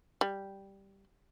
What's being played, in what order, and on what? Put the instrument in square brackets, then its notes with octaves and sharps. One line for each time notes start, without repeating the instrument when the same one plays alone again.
[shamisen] G3